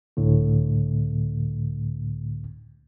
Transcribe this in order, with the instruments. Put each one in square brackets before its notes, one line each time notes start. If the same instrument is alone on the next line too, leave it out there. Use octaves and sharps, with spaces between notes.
[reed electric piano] C#2 A2 D3 A3